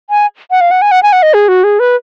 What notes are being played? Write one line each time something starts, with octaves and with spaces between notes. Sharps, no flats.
G#5
F#5
F5
F#5
G#5
F#5
G#5
F#5
D#5
G#4
F#4
G#4
B4